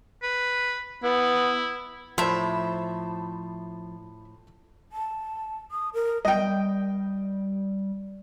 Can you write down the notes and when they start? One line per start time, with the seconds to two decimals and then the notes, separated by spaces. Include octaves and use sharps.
0.23 B4
1.04 B3 E4
2.18 A2 F3 C5 E5 A5 B5 C6
4.92 A5
5.71 D#6
5.94 A#4
6.25 G3 D#5 G5